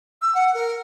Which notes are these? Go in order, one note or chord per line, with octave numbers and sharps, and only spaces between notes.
E6
F#5
A#4